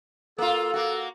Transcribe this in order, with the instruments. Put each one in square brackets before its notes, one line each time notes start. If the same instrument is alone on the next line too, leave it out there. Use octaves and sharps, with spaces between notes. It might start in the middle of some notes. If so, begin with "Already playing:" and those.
[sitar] A#3 F4 [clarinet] A4
[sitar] A#3 F#4